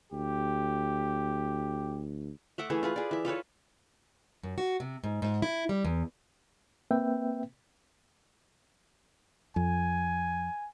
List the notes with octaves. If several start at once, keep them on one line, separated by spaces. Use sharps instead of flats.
D2 G4
A3 E5 F#5 D6
E3 A3 G#4
F4 G#4 B4
G#4 D5
E3 E5
F4 A4 B4 C#5
F#2
F#4
C3
G#2
G#2
E4
G3
E2
A#3 C4 B4 E5 G5
F2 G#5